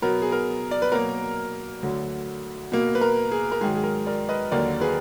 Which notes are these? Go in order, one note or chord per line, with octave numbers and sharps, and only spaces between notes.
B2 F#3 B3 A#4
G#4
A#4
D5
B4
B2 F#3 A#3 A#4
D2 D3 F#3
B2 A#3
B4
A#4
G#4
A#4
G#2 D#3 F#3 G#4
G#4
A#4
A#4 D5
B4 D#5
D#2 D3 F#3 A#3 A#4 D5
G#4 B4